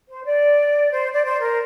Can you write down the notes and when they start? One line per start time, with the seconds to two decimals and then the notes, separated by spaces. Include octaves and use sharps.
0.09 C5
0.26 D5
0.91 C5
1.14 D5
1.24 C5
1.41 A#4